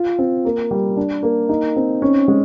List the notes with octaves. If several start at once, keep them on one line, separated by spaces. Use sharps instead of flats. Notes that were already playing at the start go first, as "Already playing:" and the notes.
Already playing: F4
C4
A#3
G3
D4
A#3
D#4
C4
C#4
G#3